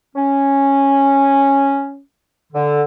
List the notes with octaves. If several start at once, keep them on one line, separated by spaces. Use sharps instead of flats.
C#4
D3